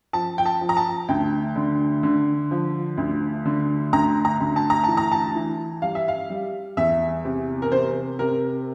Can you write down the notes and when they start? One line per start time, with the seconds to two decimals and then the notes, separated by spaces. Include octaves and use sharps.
0.13 F3 A5
0.38 G5
0.45 A5
0.61 F3
0.69 A#5
0.77 A5
1.09 D2 G5
1.56 D3
2.03 D3
2.51 F3
2.97 D2
3.45 D3
3.93 D2 A#5
4.25 A#5
4.40 D2
4.56 A5
4.70 A#5
4.84 E3 A5
4.97 A#5
5.12 A5
5.35 E3
5.82 G3 F5
5.95 E5
6.08 F5
6.30 G3
6.77 E2 E5
7.25 C3
7.62 A#4
7.71 C3 C5
8.19 C3 A#4